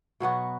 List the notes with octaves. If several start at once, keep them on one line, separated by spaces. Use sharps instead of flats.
B2 F#3 B3 F#4